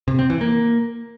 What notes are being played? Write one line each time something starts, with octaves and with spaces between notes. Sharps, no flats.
C3
C4
E3
A#3